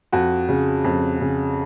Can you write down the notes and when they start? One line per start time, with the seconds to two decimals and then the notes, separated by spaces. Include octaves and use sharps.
0.13 F2 F#4
0.49 C#3
0.85 F2
1.21 C#3